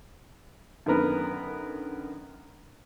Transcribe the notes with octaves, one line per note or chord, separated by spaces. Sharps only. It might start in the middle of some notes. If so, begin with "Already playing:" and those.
F#2 D3 D#3 B3 A#4 B4